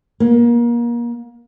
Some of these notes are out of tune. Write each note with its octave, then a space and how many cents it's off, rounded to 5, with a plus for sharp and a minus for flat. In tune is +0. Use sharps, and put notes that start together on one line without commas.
A#3 +30